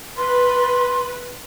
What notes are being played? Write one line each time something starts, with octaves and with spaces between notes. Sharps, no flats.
B4 C6